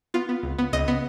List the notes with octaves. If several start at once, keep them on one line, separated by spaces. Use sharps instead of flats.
B3 F4
B3
C#2
B3
C#2 D#5
B3